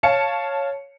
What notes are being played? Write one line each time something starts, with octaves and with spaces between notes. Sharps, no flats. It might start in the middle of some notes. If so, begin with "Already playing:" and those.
C#5 F5 A5 C#7